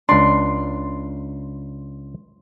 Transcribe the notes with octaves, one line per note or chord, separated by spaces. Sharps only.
C#2 D4 C6